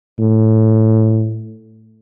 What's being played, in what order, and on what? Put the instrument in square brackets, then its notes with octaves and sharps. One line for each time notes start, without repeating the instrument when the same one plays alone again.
[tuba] A2